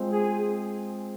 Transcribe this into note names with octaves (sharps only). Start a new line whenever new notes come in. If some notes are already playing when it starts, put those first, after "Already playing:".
Already playing: G#3 C4 F4 C5
G#4